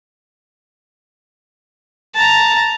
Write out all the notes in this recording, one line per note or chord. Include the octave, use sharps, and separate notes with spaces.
A5 A#5